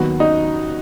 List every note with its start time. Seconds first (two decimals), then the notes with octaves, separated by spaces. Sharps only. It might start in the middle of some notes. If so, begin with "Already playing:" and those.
Already playing: D#2 D#3 F#3 B3 F#4
0.20 D#4